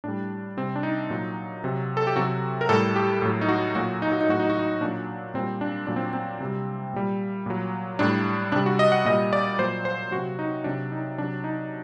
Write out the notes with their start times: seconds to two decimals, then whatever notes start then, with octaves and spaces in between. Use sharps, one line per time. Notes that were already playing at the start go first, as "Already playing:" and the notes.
0.04 A2 G3 D4
0.57 C3 G3 C4
0.76 D4
0.83 D#4
1.10 A#2 F#3
1.64 C3 F#3
1.97 A4
2.07 G4
2.16 C3 F#3 F#4
2.61 A#4
2.69 A2 G3 A4
2.96 G4
3.22 A2 F#3
3.41 D#4
3.49 F#4
3.75 A#2 F#3 F#4
4.02 D#4
4.12 F#4
4.21 D#4
4.29 A2 F#3 F#4
4.40 D#4
4.50 F#4
4.59 D#4
4.81 A#2 D4
4.86 F#3
5.34 A#2 G3 C4
5.61 D4
5.87 A#2 F#3 D4
5.96 C4
6.13 C4
6.40 C3 G3
6.93 A#2 G3
7.46 A#2 F#3
7.99 A2 G3 D4
8.52 C3 G3 D4
8.66 F#4
8.79 D#5
8.92 F#5
9.05 A#2 G3 D#5
9.33 D5
9.59 A#2 F#3 C5
9.85 C5
10.11 C3 F#3 F#4
10.39 D#4
10.64 C3 F#3 D4
10.92 D#4
11.18 C3 F#3 D4
11.44 D#4